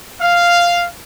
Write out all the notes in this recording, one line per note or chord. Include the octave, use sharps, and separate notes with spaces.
F5